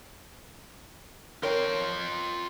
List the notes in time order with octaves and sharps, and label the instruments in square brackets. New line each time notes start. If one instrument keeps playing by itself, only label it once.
[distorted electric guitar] F4 G5 [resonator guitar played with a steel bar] A#4 [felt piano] C#5